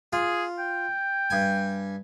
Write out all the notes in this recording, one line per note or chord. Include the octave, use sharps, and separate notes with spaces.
F4 G#4
G5
G2 G#5